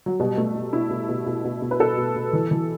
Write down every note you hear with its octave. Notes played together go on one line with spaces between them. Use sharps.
F#3
B2 G3
B2 A3
B2
B2 E4
B2
B2
B2
B2
B2
B4
B2 A4
B2
B2
E3
E3